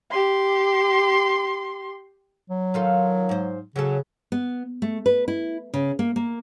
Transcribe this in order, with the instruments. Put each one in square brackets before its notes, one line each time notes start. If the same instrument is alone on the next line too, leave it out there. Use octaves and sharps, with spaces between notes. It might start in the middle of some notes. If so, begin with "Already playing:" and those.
[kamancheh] G4 C6
[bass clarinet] F#3
[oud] D#3 F4 A4
G#2 C5
[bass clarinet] C#3 [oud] F#3 C#4 A4
[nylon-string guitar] B3
A3
B4
E4
C#3
A#3
A#3